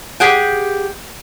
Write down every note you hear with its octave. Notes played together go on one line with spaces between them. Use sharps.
G4 G#4 F#5 G5